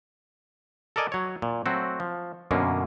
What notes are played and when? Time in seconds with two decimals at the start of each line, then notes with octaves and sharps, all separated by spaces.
0.96 A4 A#4 D5 D#5 G#5
1.12 F#3 C#5
1.42 A#2
1.66 F#3 A3 C4 F#4
2.00 F3
2.51 F#2 B2 D3 A#3 C#4